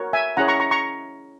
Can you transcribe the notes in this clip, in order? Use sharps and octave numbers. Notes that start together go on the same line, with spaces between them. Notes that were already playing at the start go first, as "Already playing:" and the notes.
Already playing: F#4 A#4 C#5
E5 G#5
C#4 E4 G#4 C#5 F#5 A#5
A#5 C#6
A#5 C#6
A#5 C#6